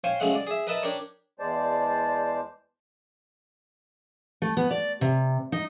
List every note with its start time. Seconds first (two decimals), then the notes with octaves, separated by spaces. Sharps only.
0.04 C5 C#5 F5 G5 G#5
0.20 C#3 F#3 G#3 A3 F#5
0.35 D5
0.47 G#4 E5
0.67 A#4 B4 D#5 E5 A5
0.83 D4 G4 A#4 C#5
1.39 E2 G#3 C5 D5 A5
4.42 A3
4.57 B3
4.71 D5
5.01 C3
5.52 D#4